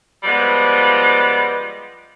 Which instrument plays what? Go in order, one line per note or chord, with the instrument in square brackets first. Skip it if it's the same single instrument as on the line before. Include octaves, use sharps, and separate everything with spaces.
[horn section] F3 G3 G#3 B3